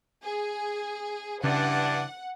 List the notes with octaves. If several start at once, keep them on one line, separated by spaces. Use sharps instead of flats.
G#4
G2 C#3 E3 C#4 D4 F#5